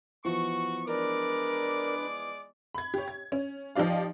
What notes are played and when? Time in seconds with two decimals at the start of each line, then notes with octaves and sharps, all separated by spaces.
0.25 E3 F3 B3 F#4 C#6
0.87 G#3 D4 A#4 B4 D5 D6
2.74 B5 G#6
2.94 G4 C#5
3.08 G#6
3.32 C#4
3.75 F3 D#4 G4 D5 F5